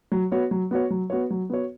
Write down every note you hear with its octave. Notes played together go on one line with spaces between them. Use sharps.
F#3
B3 F#4 C#5
F#3
B3 F#4 C#5
F#3
B3 F#4 C#5
F#3
B3 F#4 C#5